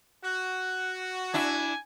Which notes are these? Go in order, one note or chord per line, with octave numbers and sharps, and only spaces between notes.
F#4 F#5
D4 E4 G#5